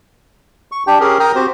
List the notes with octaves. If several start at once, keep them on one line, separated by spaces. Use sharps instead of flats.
C#6
D4 G4 G5
C#4 G4 G#4 A#4
A#4 G5 A#5 D#6 F6
C4 F#4 G4 C5